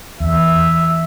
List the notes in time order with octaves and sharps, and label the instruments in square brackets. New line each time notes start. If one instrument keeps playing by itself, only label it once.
[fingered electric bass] E2 [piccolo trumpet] E5